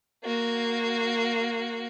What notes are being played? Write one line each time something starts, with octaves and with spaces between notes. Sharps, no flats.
A#3 F#4